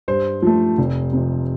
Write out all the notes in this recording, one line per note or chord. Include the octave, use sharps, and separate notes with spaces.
G2 C5
F3 A3
F1
F2 C3